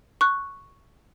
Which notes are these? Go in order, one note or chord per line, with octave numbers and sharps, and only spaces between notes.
C#6 F#6